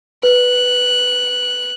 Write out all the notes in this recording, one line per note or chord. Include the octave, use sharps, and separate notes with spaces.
B4 F#6